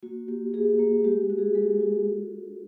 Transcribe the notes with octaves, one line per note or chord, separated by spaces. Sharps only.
A#3 F#4
A#3 G4
A#3 G#4
A#3
G#3 G4
G4
F#4
G#4
G#3 A4
F#4
F4
D4